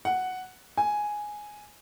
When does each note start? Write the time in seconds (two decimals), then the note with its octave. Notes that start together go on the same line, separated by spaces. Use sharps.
0.05 F#5
0.77 G#5